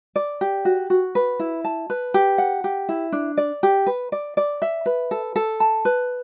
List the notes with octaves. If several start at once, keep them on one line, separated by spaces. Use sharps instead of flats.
D5
G4
F#4
F#4
B4
E4
A5
B4
G4
F#5
G4
E4
D4
D5
G4
B4
D5
D5
E5
B4
A4
A4
A5
B4